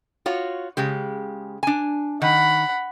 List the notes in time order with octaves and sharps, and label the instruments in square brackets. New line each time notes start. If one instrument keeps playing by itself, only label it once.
[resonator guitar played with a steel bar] F4 F#4 C#5
C#3 G#3 G4
D4 G#5
[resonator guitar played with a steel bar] D#3 [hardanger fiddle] F#5 B5